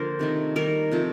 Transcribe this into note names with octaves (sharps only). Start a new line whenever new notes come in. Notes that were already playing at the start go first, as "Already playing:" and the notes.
Already playing: D3 F3 A#3 A#4 C5
C3 D#3 A3
D#3 G3 A#3 A#4
C3 F3 A3